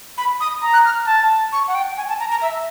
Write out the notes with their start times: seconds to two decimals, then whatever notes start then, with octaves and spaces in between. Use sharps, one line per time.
0.18 B5
0.40 D#6
0.63 A#5
0.73 F#6
0.85 F6
1.07 A5
1.52 C#6
1.68 F#5
1.75 G5
1.97 G#5
2.09 A5
2.20 A#5
2.31 A#5
2.42 E5